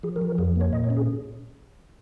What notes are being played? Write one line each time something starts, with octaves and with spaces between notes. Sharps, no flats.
F3 G#4
A#4
F3
A#4
F2 G#4
A#3
C#5
A#2 D#5
C#5
C#4
G#4